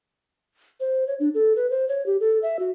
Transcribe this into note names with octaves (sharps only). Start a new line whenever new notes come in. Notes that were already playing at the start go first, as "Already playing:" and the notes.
C5
C#5
D4
A4
B4
C5
C#5
G4
A4
E5
F#4